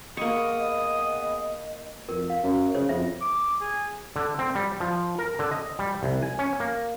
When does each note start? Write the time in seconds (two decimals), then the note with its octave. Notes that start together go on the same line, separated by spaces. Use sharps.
0.17 A#3 B3 G#4 D#5 C#6 D#6
2.09 F2 A#4
2.30 F5
2.43 F#2
2.75 C#3 C5 C#5
2.89 F2 F4 C5 E5
3.21 D6
3.60 G#4
4.16 D3
4.39 C4
4.55 G3
4.80 F3
5.19 A#4
5.39 D3
5.51 D#5
5.79 G3
6.03 C2
6.22 G#5
6.39 C#4
6.60 A#3